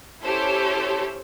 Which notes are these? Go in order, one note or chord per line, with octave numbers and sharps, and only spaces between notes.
C#4 E4 G4 A4 C5 C#5